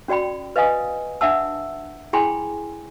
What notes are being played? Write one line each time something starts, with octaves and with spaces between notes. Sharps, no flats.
C#4 F#4 D5 G5 B5
B4 D#5 F5 G#5 D#6
D4 E5 F#5 A5 E6
E4 G#4 G5 G#5 B5 C6